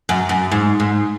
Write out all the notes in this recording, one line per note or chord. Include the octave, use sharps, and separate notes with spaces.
F#2
F#2
G#2
G#2